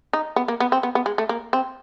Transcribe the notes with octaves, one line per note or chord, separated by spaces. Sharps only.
D#4
B3
A#3
B3
C4
B3
B3
G#3
A3
A#3
C4